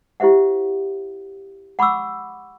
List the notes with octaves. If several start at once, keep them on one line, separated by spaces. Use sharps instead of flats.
E4 G4 C5 E5 F#5
F#5 B5 C#6 D6 E6